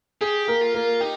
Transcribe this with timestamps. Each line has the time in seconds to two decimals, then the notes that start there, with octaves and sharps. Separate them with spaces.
0.21 G4 G#4
0.47 A#3 A#4
0.61 F4
0.74 A#3 A#4
1.00 D#4 G4